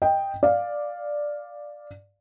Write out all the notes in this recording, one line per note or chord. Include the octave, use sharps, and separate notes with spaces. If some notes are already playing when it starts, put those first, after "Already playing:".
D#5 G5
D5 F5